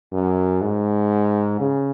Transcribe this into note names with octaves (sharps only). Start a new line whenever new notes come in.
F#2
G#2
C#3